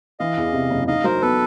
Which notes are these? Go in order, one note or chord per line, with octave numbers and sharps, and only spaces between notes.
E3 D#5 F5
E2
C3
F#1
D#4 D#5 F5
F#3 A#4 C5
B3 A4 B4